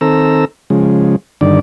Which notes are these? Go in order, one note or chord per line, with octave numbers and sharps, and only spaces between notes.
D#3 C4 A4 A#5 E6
C#3 F3 G#3
G2 D3 D#3 D5